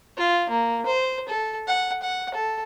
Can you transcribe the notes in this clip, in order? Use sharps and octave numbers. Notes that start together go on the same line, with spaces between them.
F4
A#3
C5
A4
F#5
F#5
A4